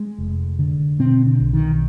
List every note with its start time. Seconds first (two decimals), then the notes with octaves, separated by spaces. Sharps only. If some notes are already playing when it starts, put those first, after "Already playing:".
Already playing: G#3
0.18 F1
0.59 D3
0.99 B2 C4
1.26 D3
1.40 B1
1.53 D#3